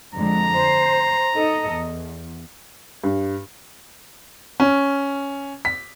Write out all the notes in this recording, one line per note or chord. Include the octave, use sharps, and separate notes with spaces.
F2 D3 G#3 A#5
C5
D#4 A4 D#5
E2
G2
C#4
B6